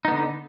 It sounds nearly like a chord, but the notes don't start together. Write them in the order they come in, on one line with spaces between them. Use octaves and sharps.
D#4 B3 D3